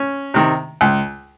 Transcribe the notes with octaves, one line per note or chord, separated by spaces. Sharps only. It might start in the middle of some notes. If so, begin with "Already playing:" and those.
Already playing: C#4
C3 D#3
C#2